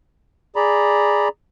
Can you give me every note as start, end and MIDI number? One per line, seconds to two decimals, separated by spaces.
0.56 1.28 68
0.56 1.28 74
0.56 1.28 82
0.56 1.28 83